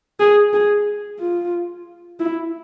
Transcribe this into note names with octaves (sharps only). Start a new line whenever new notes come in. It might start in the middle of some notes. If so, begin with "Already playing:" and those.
G#4
G#4
F4
E4